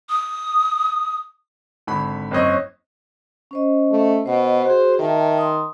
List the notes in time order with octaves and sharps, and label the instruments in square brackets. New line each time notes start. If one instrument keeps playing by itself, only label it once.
[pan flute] D#6
[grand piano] G#1 D3 B5
[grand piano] F#1 C4 D#5 [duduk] C#5
[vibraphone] C#4 C5 D#5
[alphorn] A3
[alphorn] B2 [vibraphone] C5 D#5 F#5
[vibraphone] F#4 G#4 [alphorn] C5
[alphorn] D#3 [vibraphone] E5 G5 A5
[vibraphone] C6 D#6